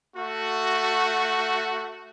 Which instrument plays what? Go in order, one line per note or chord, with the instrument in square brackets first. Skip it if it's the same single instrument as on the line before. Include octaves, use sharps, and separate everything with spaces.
[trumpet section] A3 F#4